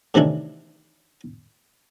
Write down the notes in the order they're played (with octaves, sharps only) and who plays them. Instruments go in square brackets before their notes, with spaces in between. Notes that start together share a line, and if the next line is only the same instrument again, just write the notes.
[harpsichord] A2 C3 D#3 E3 D4 E4